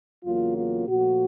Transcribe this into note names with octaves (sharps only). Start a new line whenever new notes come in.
E2 C#3 F#3 A#3 F4
F4
A#2 F3 A3 F#4